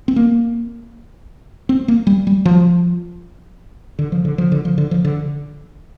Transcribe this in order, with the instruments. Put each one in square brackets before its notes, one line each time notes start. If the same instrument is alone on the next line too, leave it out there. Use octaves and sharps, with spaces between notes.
[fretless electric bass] C4
A#3
C4
A#3
G3
G3
F3
D3
F3
D3
F3
D3
F3
D3
F3
D3